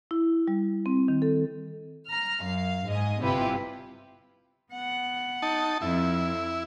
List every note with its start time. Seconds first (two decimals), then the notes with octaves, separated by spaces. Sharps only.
0.11 E4
0.48 G3
0.86 C4
1.08 D#3
1.22 A4
2.08 A#5 F6
2.44 F#2 F5
2.88 G#2 D#5 G#5
3.20 G1 C3 E4 F4 G4 B4
4.72 B3 F#5
5.42 D#4 A5
5.82 F2 E4